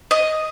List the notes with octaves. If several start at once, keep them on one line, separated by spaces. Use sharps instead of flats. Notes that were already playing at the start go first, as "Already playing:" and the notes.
D#5